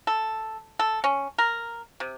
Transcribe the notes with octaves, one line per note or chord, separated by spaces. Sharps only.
A4
A4
C#4
A#4
C3